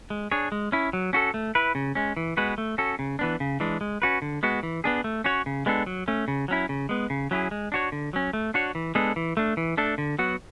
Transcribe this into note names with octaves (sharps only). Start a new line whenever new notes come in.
G#3
D4 G#4 C#5
G#3
C#4 E4
F#3
C#4 F#4 A4
A3
E4 B4
C#3
G#3 C#4
E3
G#3 B3 F#4 B4
A3
C#4 F#4 A4
C#3
E3 B3 D4
C#3
E3 G#3 D4
G#3
C#4 F#4 B4
D3
G#3 B3 F#4
E3
B3 D4 G#4
A3
C#4 F#4 C#5
C#3
G#3 B3 D4 A4
F#3
A3 C#4
C#3
F#3 C#4 E4
C#3
G#3 B3
C#3
F#3 C#4 E4 G#4
G#3
D4 F#4 C#5
D3
F#3 C#4
A3
D4 F#4 C#5
E3
G#3 B3 D4 A4
E3
A3 D4
E3
A3 D4 A4
D3
F#3 B3 F#4